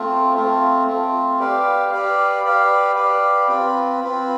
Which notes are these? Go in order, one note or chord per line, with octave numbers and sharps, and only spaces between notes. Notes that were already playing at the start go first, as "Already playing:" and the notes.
Already playing: A3 C4 F4
A3 C4 F4
A3 C4 F4
G4 B4 D5 F5
G4 B4 D5 F5
G4 B4 D5 F5
G4 B4 D5 F5
C4 F4 B4
C4 F4 B4